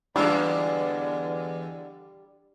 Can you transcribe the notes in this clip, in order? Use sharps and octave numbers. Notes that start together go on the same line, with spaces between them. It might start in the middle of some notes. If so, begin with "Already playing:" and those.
E2 D3 G3 G#3 D4 F4 E6